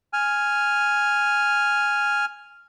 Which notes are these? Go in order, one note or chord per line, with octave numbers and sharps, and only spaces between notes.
G#5 F6